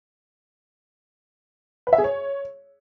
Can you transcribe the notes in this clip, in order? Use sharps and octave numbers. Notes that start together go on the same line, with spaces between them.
B4
E5
G#4
C#5